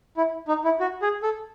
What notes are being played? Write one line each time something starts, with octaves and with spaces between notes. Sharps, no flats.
E4
D#4
E4
F#4
G#4
A4